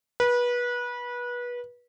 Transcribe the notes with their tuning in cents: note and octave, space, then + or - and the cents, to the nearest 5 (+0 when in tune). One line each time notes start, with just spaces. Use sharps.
B4 -25